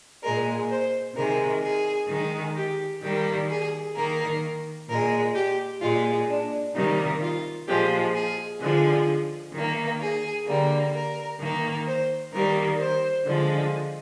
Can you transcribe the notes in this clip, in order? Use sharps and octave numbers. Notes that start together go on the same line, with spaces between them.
A#2 G#3 A#4
C5
C3 D#3 G#3 A#4
G#4
D#3 G#3
G4
D#3 G3 A#3 G4
G#4
D#3 A#3 A#4
A#2 G#3 A#4
G4
A#2 G#3 F4
D4
C3 D#3 G3 A#3 D#4
F4
A#2 F3 G#3 G4
G#4
D3 F3 G#3 G#4
D#3 A#3
G#4
D3 G3 A#3
A#4
D#3 A#3
C5
D#3 G3 A#3 A#4
C5
D3 F3 G#3